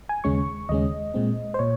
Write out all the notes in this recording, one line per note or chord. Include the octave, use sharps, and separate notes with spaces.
G#5
D#2 C#3 G#3 C#4 C#6
D#2 C#3 G#3 C#4 D#5
A#2 G#3 C4
C5
A#2 C#5